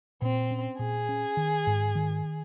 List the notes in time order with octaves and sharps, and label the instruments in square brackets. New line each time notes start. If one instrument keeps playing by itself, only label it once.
[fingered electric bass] A#2 [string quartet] C4
[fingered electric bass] C#4
[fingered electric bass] A#2 [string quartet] G#4
[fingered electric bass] C#4
D#3
G#2
D#3